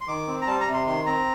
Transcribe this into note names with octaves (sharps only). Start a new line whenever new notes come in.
C6
D#3 D6
C4
A#5
G3 A5
A#5
C3
C6
D#3 C6
C4 A#5